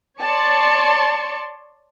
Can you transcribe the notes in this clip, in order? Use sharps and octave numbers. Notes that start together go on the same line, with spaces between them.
C#5 D5 A5 C6 C#6 C#7